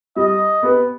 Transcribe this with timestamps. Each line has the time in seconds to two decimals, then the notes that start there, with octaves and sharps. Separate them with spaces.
0.16 G3 D#5
0.63 B3 G4 B4